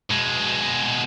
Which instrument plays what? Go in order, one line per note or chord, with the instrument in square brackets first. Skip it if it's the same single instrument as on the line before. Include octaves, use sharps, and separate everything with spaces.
[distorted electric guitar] B2 G#3